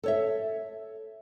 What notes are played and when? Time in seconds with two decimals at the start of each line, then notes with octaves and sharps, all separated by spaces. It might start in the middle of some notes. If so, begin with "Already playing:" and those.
0.03 A4 C#5 E5